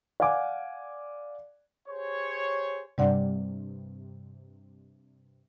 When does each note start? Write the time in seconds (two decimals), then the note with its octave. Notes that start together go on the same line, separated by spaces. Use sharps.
0.20 D5 F5 F#5 G#5 D6
1.89 G4 G#4 C5 C#5
2.98 G2 C3 G3 D5 F#5